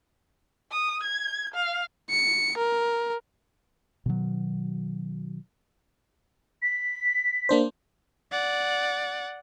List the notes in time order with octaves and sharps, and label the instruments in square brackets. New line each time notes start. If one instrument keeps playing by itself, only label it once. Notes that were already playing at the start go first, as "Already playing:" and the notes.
[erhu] D#6
G#6
F5
[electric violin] C#7
A#4
[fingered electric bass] B2 D#3 F#3
[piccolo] B6
[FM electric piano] A#3 D4 C5
[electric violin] D5 F#5